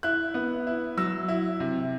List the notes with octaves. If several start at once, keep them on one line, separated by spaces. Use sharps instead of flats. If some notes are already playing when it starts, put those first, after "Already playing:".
E4 F#6
B3
E4
F#3 E6
E4
C3